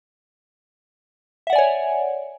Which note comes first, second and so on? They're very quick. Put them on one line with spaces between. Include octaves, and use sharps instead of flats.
E5 F#5 D5 G#5 C#5